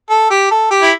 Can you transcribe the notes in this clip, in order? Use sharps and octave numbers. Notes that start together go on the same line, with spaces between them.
A4
G4
A4
G4
E4